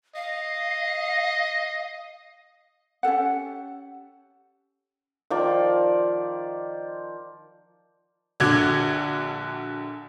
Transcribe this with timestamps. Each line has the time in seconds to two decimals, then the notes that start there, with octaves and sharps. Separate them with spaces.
0.15 D#5 F5
3.03 C#4 G4 A4 F#5
5.30 D#3 F3 D5
8.40 A#1 D3 F#4 D6 G#6